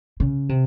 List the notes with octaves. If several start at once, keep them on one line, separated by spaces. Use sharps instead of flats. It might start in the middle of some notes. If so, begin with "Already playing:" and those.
C#3
C3